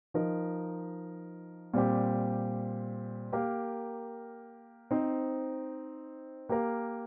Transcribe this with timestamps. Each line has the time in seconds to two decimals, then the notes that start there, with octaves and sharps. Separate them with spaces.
0.14 F3 D#4 A#4
1.74 A#2 G3 C4 G4
3.32 A#3 G4 A#4 F5
4.91 C4 D#4 C5
6.49 A#3 G4 A#4 F5